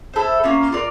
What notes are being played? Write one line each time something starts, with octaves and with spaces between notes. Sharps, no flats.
E4 A4 C5
A#3 C#4 F4
F4 A#4 D5